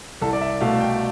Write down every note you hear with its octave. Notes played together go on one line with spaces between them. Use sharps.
C2 A4
D5
E5
B2 A3 F5
G5